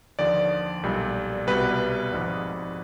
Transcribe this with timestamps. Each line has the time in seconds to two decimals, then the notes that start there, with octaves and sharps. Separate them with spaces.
0.19 D#2 D3 F3 D5
0.83 B1 A#2 G3
1.47 C2 B2 G3 B4
2.12 G#1 G#2 F3